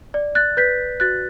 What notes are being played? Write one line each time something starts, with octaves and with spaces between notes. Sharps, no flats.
D5
F#6 A6
B4 G6 B6
F#4 F#6 A6